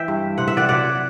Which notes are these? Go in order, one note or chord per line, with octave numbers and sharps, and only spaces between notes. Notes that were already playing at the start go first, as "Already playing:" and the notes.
Already playing: E3 E5 G5
G2
C3 F#5
E5
D5 F#5
F#3 D5 F#5